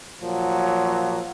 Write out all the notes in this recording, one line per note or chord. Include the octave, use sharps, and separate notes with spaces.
A#2 F3 F#3